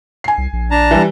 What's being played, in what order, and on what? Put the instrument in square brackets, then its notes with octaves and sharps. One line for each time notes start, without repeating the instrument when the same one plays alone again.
[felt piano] G#5 C7
[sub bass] C2
A#1
[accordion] D4 A5 A#5
[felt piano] E3 G3